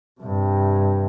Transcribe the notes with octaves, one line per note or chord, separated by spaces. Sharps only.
G2 C3